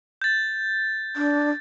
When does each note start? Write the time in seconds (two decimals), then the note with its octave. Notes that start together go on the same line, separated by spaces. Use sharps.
0.22 G6 A6
1.16 D4